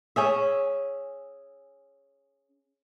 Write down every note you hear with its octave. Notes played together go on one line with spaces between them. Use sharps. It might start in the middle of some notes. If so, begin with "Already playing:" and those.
C#4 G#4 E5